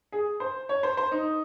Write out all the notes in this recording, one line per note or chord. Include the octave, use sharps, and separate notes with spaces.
G#4
C5
C#5
C5
C5
D#4